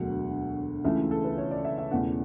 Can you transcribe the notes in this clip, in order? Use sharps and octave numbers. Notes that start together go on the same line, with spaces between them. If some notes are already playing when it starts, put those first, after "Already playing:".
Already playing: E1 D2 D3 F#3 F#5
C#2 C#3 E3 A3 E5
A4
B4
C#5
D5
E5
E5
E1 E2 C#3 E3 A3 F#5